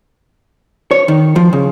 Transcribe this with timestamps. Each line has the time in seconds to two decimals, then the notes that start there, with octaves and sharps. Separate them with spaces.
0.91 C#5
1.08 D#3
1.36 F3
1.53 C#3